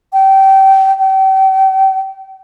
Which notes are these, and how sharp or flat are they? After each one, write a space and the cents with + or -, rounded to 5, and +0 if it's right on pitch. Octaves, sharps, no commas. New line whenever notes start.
G5 -25
G5 -35